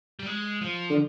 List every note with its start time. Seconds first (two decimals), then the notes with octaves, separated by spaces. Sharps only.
0.19 G3
0.26 G#3
0.61 F3
0.90 D3